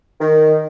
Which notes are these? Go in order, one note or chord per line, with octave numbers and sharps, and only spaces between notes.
D#3